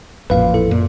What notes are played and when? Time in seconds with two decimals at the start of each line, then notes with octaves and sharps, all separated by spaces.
0.30 A1 F2 A#2 B4 F5
0.54 E4 A4
0.71 F#2 A#2